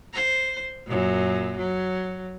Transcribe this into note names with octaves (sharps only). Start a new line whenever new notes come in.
C5
F#2 A#2
F#3